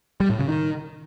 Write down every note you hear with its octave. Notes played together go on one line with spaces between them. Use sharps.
G3
A2
C#3
D#3